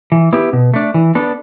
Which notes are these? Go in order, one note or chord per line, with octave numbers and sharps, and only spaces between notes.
E3
B3 E4 G4
B2
A3 D4
E3
B3 D4 A4